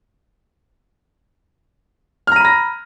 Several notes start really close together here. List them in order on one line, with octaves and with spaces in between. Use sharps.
F6 A#5 D#7 B5 A#6